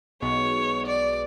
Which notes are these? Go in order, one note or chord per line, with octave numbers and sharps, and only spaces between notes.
B1 B2 G#3 B3 C#5
D5